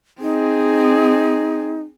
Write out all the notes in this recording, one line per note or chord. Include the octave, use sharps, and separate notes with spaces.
C4 D#4 G#4